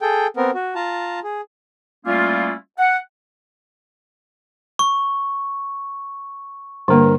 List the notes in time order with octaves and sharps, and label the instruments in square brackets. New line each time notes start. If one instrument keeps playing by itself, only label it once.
[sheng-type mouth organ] G#4 A4 G5
B3 C4 A#4
F#4
F4 A5 A#5
G#4
[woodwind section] G3 A3 A#3 C#4 E4 F4
F#5
[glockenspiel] C#6
[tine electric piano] G2 A#4 [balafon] D3 A#3